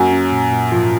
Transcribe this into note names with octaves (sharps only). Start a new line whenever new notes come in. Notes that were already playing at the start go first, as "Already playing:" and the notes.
Already playing: F#2 F#3 A#3
C#4
A#2
A#2
G#2 F3